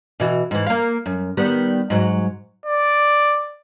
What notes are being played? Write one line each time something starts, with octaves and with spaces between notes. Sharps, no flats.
B2 E3 F#4
G#2 E3
A#3 F5
F#2
D#3 G3 B3
G#2 F#3
D5